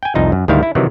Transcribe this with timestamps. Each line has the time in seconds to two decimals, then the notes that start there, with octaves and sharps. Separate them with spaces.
0.03 G5 G#5
0.15 C2 F2 D#4 F4
0.32 F#2
0.48 D2 G#2 D#3 G3 E4 F5
0.63 E4
0.75 C3 D#3 E3 F#3